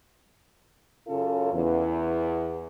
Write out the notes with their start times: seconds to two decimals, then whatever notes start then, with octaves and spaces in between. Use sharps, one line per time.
1.07 F#2 C#3 C#4 F4 A4
1.52 E2